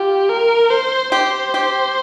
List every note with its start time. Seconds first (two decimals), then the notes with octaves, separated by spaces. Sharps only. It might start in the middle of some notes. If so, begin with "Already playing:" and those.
Already playing: F4 G4
0.29 A#4
0.71 C5
1.12 G4 C5
1.54 G4